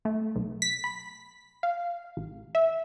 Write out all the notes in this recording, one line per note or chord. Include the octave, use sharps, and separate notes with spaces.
A3
B1
B6
B5
F5
A1
E5